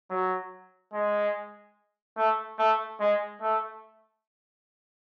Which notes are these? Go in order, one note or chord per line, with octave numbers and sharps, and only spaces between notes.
F#3
G#3
A3
A3
G#3
A3